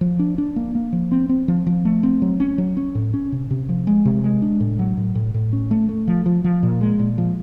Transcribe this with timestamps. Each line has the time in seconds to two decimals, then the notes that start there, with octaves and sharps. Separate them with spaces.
0.01 F3
0.19 D4
0.38 D4
0.56 A#3
0.75 A#3
0.93 F3
1.12 C4
1.29 C4
1.48 F3
1.67 F3
1.85 A3
2.03 C4
2.22 F#3
2.40 C#4
2.58 F#3
2.77 C#4
2.95 A2
3.14 C#4
3.32 C3
3.51 C3
3.69 F3
3.87 G#3
4.05 C3
4.24 G#3
4.42 D4
4.60 A2
4.79 F#3
4.97 A2
5.15 A2
5.34 A2
5.53 C#4
5.71 A3
5.89 A3
6.08 F3
6.26 F3
6.44 F3
6.63 A#2
6.81 G#3
6.99 A#2
7.18 F3